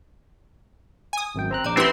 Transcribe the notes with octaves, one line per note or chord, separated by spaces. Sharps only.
G#5 D#6
G#1 F#2 G5
C4 A#5 F#6
A#1 D5 A#5 D6
C4 C#4 E4 G4 B4 G5 C6